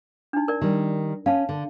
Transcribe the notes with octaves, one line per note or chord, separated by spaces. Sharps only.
D4 D#4
A#4 D5
D#3 G3
C#4 F5 A5
D3